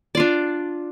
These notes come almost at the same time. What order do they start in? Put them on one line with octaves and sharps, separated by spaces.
D5 F4 D4